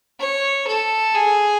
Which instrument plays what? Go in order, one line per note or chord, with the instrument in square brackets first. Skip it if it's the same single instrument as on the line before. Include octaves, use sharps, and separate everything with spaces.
[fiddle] C#5
A4
G#4